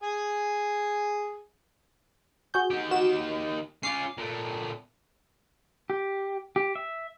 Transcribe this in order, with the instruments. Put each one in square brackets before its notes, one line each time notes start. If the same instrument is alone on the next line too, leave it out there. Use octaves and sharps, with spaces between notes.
[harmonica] G#4 G#5
[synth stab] F#4 G#4 G6
[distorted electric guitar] D#3 G4
[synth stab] F#4 E7
[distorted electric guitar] C#4 F4 [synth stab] D6 C7
[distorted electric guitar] A#2 A3
[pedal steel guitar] G4
G4
E5